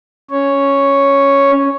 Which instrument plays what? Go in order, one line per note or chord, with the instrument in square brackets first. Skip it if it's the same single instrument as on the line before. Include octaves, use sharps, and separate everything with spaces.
[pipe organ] C#4 C#5